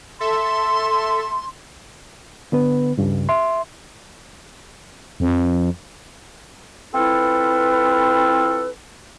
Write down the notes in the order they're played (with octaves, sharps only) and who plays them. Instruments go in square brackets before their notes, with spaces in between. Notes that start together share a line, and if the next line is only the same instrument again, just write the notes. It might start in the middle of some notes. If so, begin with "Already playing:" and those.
[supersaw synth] A4 E5 [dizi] C6
[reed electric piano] D3 B3 B4
C#2 G2 C#3
E5 C6
[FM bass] F2
[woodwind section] C4 E4 F4 A4 B4